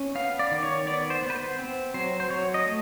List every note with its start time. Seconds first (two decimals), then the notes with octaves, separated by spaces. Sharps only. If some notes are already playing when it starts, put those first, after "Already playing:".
Already playing: C#4
0.15 B3 F5
0.39 D5
0.51 D#3
0.63 C#5
0.87 B3 D5
1.10 C5
1.23 B3
1.30 B4
1.34 C5
1.59 C4
1.94 F#3 C5
2.20 C5
2.30 F#3 C#5
2.54 D#5
2.66 A3